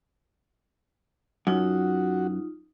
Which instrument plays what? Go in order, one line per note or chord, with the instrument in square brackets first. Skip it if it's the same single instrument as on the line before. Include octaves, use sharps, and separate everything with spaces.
[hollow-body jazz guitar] F#2 [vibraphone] D#4 F4 [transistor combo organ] F#4